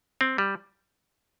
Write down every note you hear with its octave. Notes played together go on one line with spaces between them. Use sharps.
C4
G3